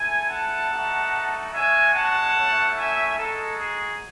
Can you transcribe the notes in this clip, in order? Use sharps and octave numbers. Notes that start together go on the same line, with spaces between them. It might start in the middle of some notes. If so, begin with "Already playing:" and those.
Already playing: A3 E4 G#5
F#5 A5
A3 D#4 F#4
G#3 C#4 F#4 E5 G#5
F#5 A5
A3 C#4 E4
E5 G#5
G#3 D#4 F#4 A4
G#4